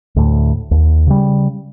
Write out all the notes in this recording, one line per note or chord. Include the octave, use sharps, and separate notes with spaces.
D2 A2
D#2
C#3 G3